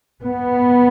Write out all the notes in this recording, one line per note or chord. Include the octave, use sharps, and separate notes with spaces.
B3